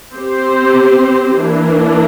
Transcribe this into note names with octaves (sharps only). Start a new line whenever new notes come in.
C4 G4 C5
E3 A#3 D4